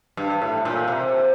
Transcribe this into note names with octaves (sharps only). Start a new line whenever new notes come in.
G2
A2
A#2
C3